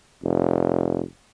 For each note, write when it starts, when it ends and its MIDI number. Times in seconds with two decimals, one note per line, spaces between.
0.23 1.03 29